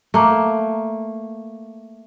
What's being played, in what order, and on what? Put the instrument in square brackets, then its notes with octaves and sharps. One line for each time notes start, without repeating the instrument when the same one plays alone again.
[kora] A3 A#3